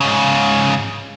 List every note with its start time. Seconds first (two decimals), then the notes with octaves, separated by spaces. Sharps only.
0.01 G#2 C#3